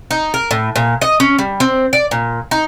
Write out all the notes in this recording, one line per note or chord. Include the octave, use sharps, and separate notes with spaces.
D#4
A#4
A2
A#2
D#5
C#4
G3
C4
D5
A#2
D#4